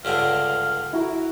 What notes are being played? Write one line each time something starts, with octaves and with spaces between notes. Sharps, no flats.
C#2 G2 D3 F5
E4 F#4 A#4